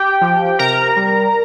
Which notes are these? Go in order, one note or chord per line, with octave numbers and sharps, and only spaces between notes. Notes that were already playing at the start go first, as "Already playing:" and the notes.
Already playing: G4 G5
F3
C3 A#4 A#5
G3